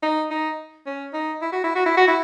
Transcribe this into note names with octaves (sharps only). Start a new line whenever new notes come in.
D#4
D#4
C#4
D#4
E4
F#4
E4
F#4
E4
F#4
E4